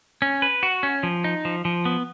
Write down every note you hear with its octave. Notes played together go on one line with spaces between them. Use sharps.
C#4
B4
F#4
C#4
F3
D#4
F3
F3
B3